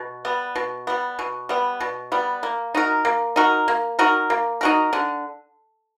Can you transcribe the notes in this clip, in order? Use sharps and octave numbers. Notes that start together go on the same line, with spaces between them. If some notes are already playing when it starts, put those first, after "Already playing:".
Already playing: B2
G3 B3
B2
G3 B3
B2
G3 B3
B2
G3 B3
A#3
D#4 F#4 A#4
A#3
D#4 F#4 A#4
A#3
D#4 F#4 A#4
A#3
D#4 F#4 A#4
D3